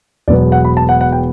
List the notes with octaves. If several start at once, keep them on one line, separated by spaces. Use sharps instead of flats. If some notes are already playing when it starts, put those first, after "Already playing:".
E1 E2 B2 F#3 B3 D5
F#5
B5
A5
F#5
F#5
G5